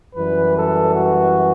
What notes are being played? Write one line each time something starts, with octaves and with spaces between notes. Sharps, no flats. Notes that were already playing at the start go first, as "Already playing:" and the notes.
F#2 E3 G3 B4
A4
F#4